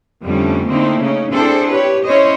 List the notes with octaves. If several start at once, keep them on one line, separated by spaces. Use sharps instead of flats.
F2 D3 G3 A3 C#4
D3 A3 A#3 C4 D#4 E4
C#3 C#4 D#4
C4 D4 E4 G#4 A4 C5
G4 B4 C#5
C#4 E4 C5 C#5 D#5